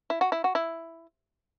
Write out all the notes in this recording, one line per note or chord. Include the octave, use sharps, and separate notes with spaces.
E4
F#4
E4
F#4
E4